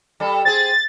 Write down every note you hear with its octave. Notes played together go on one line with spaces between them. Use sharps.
G3 A4
C4 G#4 A6